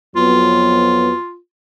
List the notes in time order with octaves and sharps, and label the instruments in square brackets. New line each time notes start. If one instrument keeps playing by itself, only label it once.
[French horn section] F2 F#3 B3 [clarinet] F4